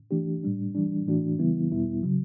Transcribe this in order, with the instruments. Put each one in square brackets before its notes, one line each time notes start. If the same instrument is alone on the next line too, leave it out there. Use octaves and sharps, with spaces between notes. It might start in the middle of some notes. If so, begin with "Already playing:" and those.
[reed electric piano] E3 A3 D4 G4
A2 G3 D4
E3 G3 D4
A2 E3 A3 D4 F#4
C#3 E3 G3 B3 E4
E2 B2 G3 B3 E4
C#3 F#3